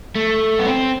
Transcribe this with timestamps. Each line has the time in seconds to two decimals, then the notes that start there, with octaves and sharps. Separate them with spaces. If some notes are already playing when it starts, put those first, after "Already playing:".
0.16 A3
0.59 B3
0.66 C4